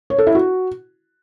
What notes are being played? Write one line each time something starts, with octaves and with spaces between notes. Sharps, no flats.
C#5
A4
E4
F#4